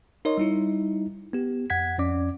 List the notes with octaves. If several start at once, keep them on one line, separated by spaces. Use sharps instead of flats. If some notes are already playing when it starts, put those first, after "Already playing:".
D#4 A#4 C#5 D#5 C6
G3 D#4 E4
B3 G4
F2 F#5 G#6 B6
F2 C#4 D5 D6